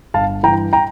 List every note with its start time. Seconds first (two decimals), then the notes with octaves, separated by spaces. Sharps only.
0.14 G1 F5 A5
0.43 G2 E3 G5 A#5
0.73 G5 A#5